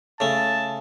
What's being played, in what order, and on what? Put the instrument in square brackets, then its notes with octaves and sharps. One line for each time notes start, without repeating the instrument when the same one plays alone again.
[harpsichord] C#3 A3 [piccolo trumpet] A5